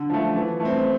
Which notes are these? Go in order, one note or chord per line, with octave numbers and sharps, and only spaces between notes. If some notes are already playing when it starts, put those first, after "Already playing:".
Already playing: D3
F3 A3
E3
A3
C4